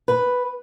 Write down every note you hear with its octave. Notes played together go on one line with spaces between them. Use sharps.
B4